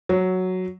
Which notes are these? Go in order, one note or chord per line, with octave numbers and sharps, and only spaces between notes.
F#3